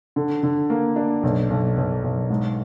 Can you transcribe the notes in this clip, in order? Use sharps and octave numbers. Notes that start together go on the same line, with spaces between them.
D3
D3
A#3
D4
B1
B1
B1
B1
G#2